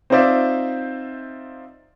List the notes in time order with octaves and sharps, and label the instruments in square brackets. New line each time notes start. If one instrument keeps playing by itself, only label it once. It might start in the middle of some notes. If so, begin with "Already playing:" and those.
[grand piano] C4 D#4 F4 C5 D5 E5